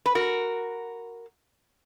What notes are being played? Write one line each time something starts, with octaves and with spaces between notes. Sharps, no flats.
B4
F#4 A#4